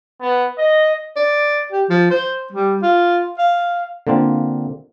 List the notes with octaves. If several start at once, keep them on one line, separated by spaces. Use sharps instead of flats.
B3
D#5
D5
G4
F3
C5
G3
F4
F5
D3 A#3 C4 F4